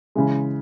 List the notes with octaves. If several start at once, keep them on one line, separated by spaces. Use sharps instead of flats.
C#3 E3 G#3